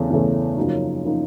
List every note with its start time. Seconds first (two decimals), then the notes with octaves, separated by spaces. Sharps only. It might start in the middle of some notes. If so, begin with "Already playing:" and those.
Already playing: E2 C#3 E3 A3
0.10 E2 C#3 E3 A3
0.57 F#2 C#3 F3 A#3 D#4
1.04 C#3 F3 A#3 D#4